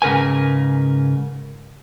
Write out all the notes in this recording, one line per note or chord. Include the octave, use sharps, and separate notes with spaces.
G#2 C#3 A#4 B4 G#5